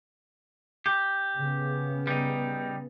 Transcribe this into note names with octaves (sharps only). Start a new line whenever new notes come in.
G4
C#3 B3
G3 D#4